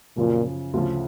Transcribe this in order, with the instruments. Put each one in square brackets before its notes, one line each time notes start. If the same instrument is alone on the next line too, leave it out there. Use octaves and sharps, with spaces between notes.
[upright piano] F#2 C#3 F3 [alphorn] A#2
[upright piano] D2 C#3 F3